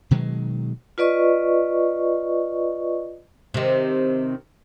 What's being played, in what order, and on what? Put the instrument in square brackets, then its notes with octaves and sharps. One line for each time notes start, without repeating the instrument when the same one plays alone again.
[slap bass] B2 D#3 F#3 G#3
[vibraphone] F4 B4 D5 D#5 C#6
[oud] C3 D#3